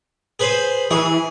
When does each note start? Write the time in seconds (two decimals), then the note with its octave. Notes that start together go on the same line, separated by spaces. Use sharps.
0.39 G#4 B4 C5
0.91 E3 G#4